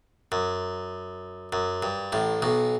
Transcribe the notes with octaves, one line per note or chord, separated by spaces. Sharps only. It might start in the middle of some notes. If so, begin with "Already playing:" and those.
F#2
F#2
G2
A1 A2
B1 B2